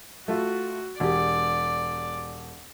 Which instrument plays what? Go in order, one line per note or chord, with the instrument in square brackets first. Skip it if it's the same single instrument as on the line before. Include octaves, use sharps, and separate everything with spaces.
[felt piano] A3 F4 [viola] F#4
[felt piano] E1 G4 [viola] D5